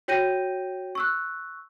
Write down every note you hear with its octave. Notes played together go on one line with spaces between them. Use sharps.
F#4 C#5 G5 G6 A#6 D#7
C#6 E6 F#6